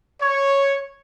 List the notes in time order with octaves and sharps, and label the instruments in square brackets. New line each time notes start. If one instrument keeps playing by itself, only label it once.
[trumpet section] C#5